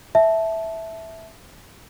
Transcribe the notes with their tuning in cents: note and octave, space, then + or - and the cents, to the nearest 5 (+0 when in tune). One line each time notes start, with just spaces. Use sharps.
E5 -10 A5 -10